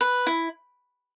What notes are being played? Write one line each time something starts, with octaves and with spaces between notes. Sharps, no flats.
B4
E4